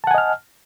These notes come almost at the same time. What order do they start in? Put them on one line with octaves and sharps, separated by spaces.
A5 F#5 G#5 D#5 F6